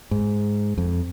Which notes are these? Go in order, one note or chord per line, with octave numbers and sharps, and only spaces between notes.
G#2
F2